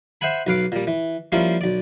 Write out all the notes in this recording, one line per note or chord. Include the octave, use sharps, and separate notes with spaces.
C5 E5 F#5 G#5 B5
B1 B4 F5 D6
A#2 G3
E3
F3 G3 A#3 C#4 E4 F4
B1 D5